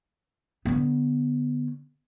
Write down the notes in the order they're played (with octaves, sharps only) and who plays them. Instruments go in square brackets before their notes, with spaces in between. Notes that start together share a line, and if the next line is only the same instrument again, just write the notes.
[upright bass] D3 B3